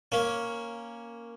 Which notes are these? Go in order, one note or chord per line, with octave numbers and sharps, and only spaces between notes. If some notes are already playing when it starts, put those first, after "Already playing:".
A#3 C#4